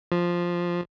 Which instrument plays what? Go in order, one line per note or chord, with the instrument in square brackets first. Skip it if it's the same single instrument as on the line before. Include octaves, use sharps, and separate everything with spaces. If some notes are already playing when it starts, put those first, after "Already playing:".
[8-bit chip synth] F3